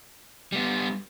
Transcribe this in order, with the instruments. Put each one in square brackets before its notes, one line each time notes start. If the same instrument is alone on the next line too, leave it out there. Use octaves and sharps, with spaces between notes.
[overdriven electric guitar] G3 B3